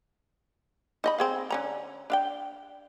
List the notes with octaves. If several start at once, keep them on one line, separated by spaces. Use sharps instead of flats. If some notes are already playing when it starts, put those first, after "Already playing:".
D#4 D#5 B5
C4 G#4 F5
D3 C#4 A#5
D4 F5 G5